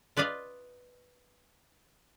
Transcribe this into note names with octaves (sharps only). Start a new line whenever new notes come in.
F4 B4 D5 D#5 F5